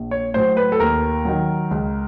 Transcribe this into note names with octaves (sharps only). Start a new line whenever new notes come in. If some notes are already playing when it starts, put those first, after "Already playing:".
Already playing: A#1
C#5
A2 F#3 C5
B4
A4
D#2 A#4
D#3 F#3
C#2